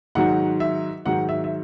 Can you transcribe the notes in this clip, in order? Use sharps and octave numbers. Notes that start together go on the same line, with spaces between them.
G#2 D#3 F#3 F#5
E5
G#2 D#3 F#3 F#5
E5
E5